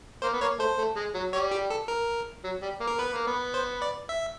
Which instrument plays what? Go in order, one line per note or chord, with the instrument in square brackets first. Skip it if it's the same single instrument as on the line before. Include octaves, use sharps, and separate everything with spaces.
[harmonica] A#3 [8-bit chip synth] C5
[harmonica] B3
[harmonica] A#3 [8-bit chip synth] C#5
[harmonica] A3 [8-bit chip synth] C5
[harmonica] A3
G#3
F#3
[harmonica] G3 [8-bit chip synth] C#5
[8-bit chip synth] G4
A4
A#4
[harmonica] F#3
G3
A#3
[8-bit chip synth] A#4
[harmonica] B3 [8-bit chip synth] B4
[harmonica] A#3
B3
[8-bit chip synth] C5
D5
E5